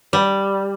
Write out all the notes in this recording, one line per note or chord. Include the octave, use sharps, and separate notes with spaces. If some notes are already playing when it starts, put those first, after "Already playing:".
G3